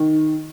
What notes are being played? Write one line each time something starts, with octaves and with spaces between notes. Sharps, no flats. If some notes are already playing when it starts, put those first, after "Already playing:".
Already playing: D#3